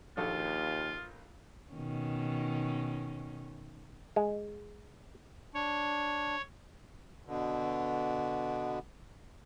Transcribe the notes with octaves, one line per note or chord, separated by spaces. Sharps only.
A#1 D#2 F4 F#4 A4
B2 D#3 C#4
G#3
D4 C#5
B2 D3